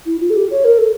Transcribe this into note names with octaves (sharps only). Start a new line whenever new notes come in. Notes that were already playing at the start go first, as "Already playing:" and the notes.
E4
F4
A4
G4
C#5
A#4
A4